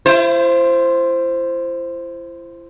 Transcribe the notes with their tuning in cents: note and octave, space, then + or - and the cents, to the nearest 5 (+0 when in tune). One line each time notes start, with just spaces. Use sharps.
E4 +45 C5 +0